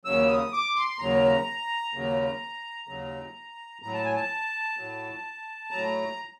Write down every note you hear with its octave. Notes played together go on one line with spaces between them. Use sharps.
D#2 C#3 F#3 E6
D#6
D6
C6
D#2 C#3 F#3 A#5
D#2 C#3 F#3
D#2 C#3 F#3
A2 F#3 A#5
A5
G#5
A5
A2 F#3
A2 F#3 A#5